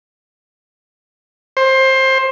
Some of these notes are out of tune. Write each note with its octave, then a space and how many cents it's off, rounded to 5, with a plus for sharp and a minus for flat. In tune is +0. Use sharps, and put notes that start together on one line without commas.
C5 +20